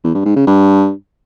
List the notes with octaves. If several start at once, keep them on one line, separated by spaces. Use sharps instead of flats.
E2
G2
G#2
C#3
G2